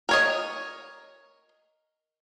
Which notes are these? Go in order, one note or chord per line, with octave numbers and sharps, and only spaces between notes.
A#4 C#5 D#5